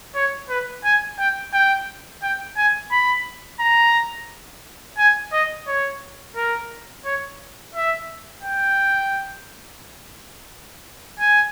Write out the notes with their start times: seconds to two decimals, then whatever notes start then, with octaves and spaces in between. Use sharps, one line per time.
0.15 C#5
0.49 B4
0.84 G#5
1.18 G5
1.53 G5
2.22 G5
2.57 G#5
2.91 B5
3.60 A#5
4.98 G#5
5.32 D#5
5.67 C#5
6.36 A#4
7.05 C#5
7.74 E5
8.43 G5
11.19 G#5